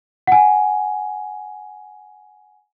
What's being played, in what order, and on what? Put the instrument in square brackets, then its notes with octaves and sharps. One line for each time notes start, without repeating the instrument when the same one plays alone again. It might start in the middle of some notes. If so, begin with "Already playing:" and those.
[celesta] F#5 G#5